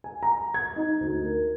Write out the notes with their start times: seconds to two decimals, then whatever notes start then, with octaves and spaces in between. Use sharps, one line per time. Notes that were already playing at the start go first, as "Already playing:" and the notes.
0.04 G#5
0.23 A#5
0.54 G#6
0.76 D#4
1.00 D2
1.23 A#4